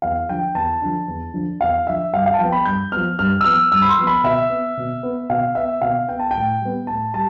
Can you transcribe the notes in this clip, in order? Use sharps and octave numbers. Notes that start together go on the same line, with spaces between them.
E2 F5
D3 F3 G5
E2 A5
D3 F3
E2
D3 F3
E2 F5
D3 F3 E5
G2 F5
F5
A5
F3 B3 G5
B5
G2 G6
F3 B3 F6
G2 F6
E6
F3 B3 F6
G2 E6
B5
C6
F3 B3
B5
B2 E5
B3
B2
B3
B2 F5
B3 E5
B2 F5
B3 G5
A5
A2 G5
G3 B3
A2 A5
G3 A5